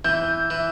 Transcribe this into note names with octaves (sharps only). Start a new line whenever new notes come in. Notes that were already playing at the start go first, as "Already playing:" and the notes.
E3 G6
E3